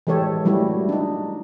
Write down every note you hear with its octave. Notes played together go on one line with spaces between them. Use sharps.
E3 G#3 G4 A4 C#5
F#3 G3 A3 E4 F#4
D4 D#4